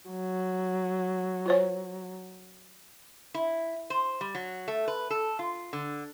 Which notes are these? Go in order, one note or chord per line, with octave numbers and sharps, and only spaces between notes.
F#3
F4 C5 C#5
E4
C5
G3
F#3
A3
B4
A4
F4
D3